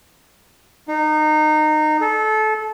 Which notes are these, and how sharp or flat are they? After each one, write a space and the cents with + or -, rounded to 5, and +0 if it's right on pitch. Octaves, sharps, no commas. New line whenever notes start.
D#4 -20
A4 -25